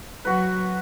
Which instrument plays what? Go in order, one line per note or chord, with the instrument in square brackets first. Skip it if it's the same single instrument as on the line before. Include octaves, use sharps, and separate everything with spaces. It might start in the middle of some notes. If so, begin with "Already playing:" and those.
[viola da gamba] F#3 [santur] F#4 B4